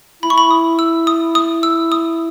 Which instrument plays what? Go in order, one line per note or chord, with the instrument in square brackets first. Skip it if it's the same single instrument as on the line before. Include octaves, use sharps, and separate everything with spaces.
[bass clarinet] E4 [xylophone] B5
[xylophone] C#6
B5
D#6
E6
D#6
D#6
E6
D#6